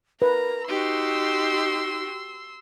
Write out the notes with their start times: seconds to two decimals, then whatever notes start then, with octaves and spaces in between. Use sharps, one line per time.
0.22 A#4 B4 A#5
0.68 D#4 F#4 G4 C6 E6